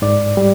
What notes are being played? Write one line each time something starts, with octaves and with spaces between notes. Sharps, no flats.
G#2 D5
G3